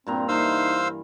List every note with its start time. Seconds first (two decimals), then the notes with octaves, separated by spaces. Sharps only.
0.07 G2 A#2 C4 A#5
0.29 E3 D#4 C5 F5 E6